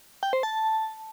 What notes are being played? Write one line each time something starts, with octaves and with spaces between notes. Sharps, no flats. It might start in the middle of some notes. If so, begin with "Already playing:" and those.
G5
C5
A5